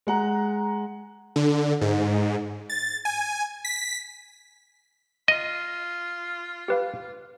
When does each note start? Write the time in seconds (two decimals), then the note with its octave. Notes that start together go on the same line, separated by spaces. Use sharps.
0.07 G#3 F#5 A#5
1.36 D3
1.81 G#2
2.70 A6
3.05 G#5
3.65 B6
5.28 F4 D#5
6.68 G4 B4 F5